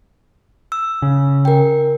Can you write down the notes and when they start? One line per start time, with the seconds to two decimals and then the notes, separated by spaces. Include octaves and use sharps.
0.72 E6
1.02 C#3
1.45 A#4 G5